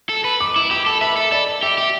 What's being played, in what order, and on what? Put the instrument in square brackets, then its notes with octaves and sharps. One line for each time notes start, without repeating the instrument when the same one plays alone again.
[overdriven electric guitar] A4
B4
[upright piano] D6
[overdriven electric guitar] E4
[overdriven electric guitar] G4 [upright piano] D6
[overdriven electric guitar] A4
[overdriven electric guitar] B4 [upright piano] E5
[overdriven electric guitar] A4
[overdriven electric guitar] A4 [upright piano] D5
[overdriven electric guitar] G4 [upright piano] E5
[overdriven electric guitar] G4